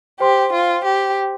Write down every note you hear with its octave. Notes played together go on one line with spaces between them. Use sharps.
G4 C5 G5 C6
F4
G4